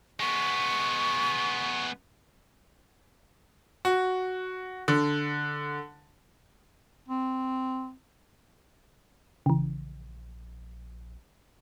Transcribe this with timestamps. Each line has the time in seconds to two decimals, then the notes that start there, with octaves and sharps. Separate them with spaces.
0.20 G#3 B3 C#6
3.85 F#4
4.88 D3
7.08 C4
9.46 A#1 C#3 E3